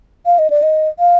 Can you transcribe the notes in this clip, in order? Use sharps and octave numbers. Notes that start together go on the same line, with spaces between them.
F5
D#5
D5
D#5
F5